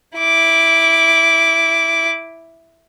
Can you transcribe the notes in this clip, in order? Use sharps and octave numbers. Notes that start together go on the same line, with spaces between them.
E4 D6